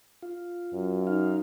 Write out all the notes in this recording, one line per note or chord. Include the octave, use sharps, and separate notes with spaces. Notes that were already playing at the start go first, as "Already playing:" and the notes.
F4
F#2
D#4 F5